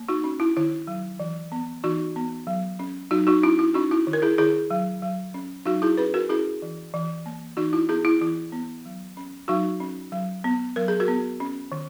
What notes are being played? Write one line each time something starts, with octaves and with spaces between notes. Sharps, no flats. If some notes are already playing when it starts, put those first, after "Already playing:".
Already playing: A#3
D#4 F#4
C#4
E4
D#3 E4
F#3
E3
B3
E3 D#4 F#4
B3
F#3
C#4
F#3 D#4 F#4
D#4 F#4
C#4 E4
E4
C#4 D#4 F#4
E4
D#3
A#4
E4 G#4
D#3 E4 G#4
F#3
F#3
C#4
F#3 D#4 F#4
E4 G#4
C#4 G#4 B4
F#4 A#4
C#4 E4 G#4
E3
E3
A#3
E3 D#4 F#4
E4
B3 E4 G#4
E4
E3 E4
B3
F#3
C#4
F#3 D#4 F#4
C#4
F#3
B3
F#3 A#4
G#4
F#4 A#4
B3
C#4
D#3